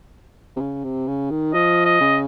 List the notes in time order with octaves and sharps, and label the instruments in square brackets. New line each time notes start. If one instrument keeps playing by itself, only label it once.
[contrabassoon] C3
C#3
C3
C#3
D#3
[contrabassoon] F3 [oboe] D#5
[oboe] D#5
[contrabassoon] C#3